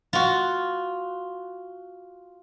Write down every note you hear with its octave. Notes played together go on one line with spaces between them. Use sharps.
F4 F#4